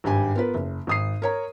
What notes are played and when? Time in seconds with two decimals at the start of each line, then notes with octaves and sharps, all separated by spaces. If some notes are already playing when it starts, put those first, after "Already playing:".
0.04 G#1 G2 G4 G#5
0.35 B3 F4 A#4 B4
0.54 F#1
0.87 G#1 D#6 C7
1.22 A#4 C#5 A#5